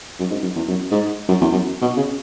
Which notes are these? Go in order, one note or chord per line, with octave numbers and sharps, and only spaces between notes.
F#2
G#2
F#2
E2
F#2
G#2
F#2
E2
F#2
B2
C#3